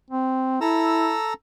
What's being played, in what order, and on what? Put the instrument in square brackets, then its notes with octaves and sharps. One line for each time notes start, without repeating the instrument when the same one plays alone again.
[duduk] C4
[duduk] E4 [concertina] A4 A#5 E6